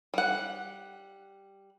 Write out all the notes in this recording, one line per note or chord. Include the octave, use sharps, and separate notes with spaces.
G3 F#5